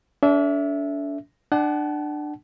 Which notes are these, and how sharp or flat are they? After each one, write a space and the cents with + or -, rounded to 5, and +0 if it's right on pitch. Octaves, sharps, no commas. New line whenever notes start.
D4 -40 A4 +0 E5 +0
D4 +20 F#5 +35 A5 -35